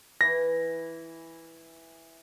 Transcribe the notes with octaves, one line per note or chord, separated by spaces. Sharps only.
E3 E4 A#6